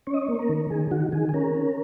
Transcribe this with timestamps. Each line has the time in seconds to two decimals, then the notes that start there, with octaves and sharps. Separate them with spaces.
0.07 C#4 C#5
0.14 D#5
0.22 C#5
0.28 A#3
0.35 C#5
0.39 A#4
0.49 D#3
0.70 D#3 G#4
0.91 D#3 F#4
1.12 D#3 G#4
1.29 G#4
1.34 C#4 A#4
1.55 C#4